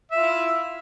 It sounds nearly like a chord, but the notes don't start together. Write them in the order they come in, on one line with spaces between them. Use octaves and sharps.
E5 F4 E4